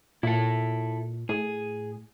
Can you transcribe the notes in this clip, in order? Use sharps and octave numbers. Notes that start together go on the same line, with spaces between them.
A#2 E4 A4
A2 G#4